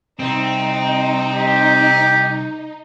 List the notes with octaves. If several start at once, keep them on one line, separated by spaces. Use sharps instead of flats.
C2 C4 D#4
G4